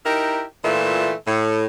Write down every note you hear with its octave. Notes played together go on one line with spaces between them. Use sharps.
D#4 E4 G4 A#4
A#2 E3 A3 F4
A2